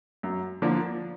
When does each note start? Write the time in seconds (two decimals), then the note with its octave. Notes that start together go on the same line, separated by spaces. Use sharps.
0.23 F#2
0.62 D3 F3 A#3